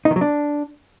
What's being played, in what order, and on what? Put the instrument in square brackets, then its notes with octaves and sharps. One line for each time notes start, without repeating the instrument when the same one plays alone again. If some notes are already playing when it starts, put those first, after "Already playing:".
[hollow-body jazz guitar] D#4
D#3
F#3
D4